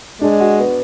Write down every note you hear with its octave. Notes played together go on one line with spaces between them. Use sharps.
G#3 D4
F#4
B3